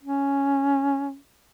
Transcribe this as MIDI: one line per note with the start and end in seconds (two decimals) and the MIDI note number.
0.03 1.16 61